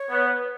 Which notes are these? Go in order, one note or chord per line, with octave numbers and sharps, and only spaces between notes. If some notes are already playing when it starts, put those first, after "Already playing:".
Already playing: C#5
B3